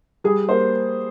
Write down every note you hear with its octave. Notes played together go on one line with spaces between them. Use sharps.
G3 G#4
A#3 C5